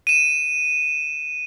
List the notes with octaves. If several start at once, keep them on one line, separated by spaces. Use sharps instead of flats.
D#7 E7